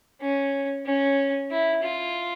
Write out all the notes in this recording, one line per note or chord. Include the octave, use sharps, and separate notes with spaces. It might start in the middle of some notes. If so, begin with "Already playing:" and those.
C#4
C#4
E4
F4